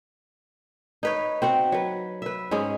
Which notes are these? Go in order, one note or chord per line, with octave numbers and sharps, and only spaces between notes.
D#4 B4 C#5
C4 F#4 F#5
F#3 B4
B4 E5
G#2 G#3 C#4 G#4